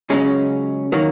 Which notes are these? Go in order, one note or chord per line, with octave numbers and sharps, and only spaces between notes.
C#2 C#3 F#3 G#3 C#4
D#3 F#3 A#3